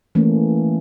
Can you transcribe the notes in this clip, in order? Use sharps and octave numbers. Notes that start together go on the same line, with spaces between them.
E3 A3 A#3 C#4